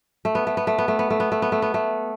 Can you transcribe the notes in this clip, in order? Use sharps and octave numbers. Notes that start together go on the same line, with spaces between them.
A3
B3
A3
B3
A3
B3
A3
B3
A3
B3
A3
B3
A3
B3
A3